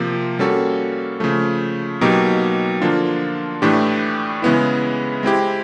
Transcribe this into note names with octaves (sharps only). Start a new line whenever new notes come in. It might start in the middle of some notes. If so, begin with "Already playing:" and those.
Already playing: C3 F3 A#3
G3 A#3 C#4 F#4 A4
C#3 F3 A3
B2 F#3 A#3 D#4 G4
D3 F3 A#3 D4 F4
A2 E3 A3 D4 G4
C#3 E3 G#3 B3 E4
G#3 C4 E4 G4